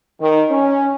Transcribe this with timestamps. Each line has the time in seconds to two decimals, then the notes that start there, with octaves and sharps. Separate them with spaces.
0.21 D#3
0.50 C#4